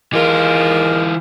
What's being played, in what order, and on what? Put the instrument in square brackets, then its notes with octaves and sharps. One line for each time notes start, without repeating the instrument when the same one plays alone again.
[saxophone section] D#2 G#3 A#4 [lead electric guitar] E3 F4